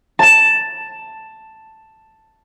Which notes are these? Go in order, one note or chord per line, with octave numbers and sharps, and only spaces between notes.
A5 E7